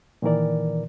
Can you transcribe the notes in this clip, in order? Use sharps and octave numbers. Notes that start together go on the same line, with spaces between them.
A#2 D#3 E3 A#4 D5